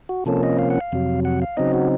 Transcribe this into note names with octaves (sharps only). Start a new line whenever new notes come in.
F#4
C3 F3 A#3 C#4 A4
D#5
F5
F#5
F5
F2 C3 F#3
F#5
F5
C#3 F#3 C4 D#4 D#5
F#4